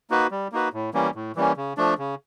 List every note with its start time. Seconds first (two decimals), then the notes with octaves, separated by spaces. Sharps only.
0.10 A#3 D#4 F#4 B4
0.31 G3
0.52 A#3 D#4 F#4 B4
0.73 A2
0.94 E3 G3 A#3 C#4
1.15 A2
1.36 E3 G3 A#3 C#4
1.57 C#3
1.77 F3 A3 D4
1.98 C#3